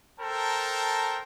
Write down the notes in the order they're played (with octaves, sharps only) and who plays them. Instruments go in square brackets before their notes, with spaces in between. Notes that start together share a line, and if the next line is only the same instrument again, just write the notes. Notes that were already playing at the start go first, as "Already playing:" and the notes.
[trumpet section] A4 A#4 C5 G5 A5 A#5